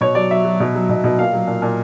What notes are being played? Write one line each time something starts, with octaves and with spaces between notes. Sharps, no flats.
B2 C#5
F#3 D5
F#3 E5
F#3
B2
F#3
B2
B2
A#2 F5
F#3
A#2
A#2